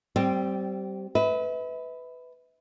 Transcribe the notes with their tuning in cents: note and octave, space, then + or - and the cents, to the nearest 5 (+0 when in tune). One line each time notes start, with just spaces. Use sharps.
G3 -25 C4 -5
B4 +15 E5 -40